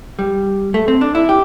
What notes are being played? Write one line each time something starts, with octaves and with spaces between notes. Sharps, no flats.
G3
A3
C4
D4
E4
G4